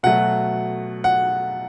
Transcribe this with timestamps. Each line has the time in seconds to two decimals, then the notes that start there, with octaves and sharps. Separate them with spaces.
0.03 B2 F#3 A3 F#5
1.04 F#5